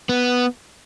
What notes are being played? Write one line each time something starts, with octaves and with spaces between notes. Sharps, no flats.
B3